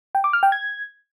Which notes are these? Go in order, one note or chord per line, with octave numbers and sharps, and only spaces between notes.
G5
D6
F6
G5
G#6